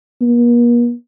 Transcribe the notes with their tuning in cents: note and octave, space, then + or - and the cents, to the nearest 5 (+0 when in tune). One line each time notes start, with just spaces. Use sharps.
A#3 +45